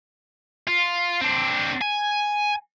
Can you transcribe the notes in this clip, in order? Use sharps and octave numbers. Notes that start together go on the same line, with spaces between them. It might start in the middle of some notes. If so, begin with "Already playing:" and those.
F4
C4 D4
G#5